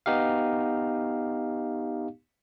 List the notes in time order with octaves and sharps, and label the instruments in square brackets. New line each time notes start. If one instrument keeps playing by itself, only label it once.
[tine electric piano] B3 D#4 G4 F5